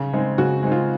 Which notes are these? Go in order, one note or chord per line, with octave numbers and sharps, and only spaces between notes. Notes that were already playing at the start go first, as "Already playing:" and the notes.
Already playing: C#3
G#3 C4 D#4
C#3 F#4
G#3 C4 D#4
F4